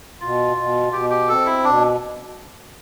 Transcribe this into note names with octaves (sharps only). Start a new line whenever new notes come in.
B2 F4
B2
B2 G4
G4
C4 A4
E4
B2 D4